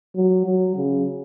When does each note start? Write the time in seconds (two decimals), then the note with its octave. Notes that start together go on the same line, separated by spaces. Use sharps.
0.16 F#3
0.45 F#3
0.76 C#3